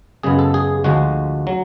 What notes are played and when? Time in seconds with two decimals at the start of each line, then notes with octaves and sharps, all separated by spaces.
0.23 F#2 C#3 G#3 B3 G#4
0.39 A4
0.54 G#4
0.84 D2 D3 F3 G#3 F#4
1.47 F#3